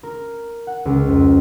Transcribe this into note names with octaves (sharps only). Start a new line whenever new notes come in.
A#4
F#5
C#2
F2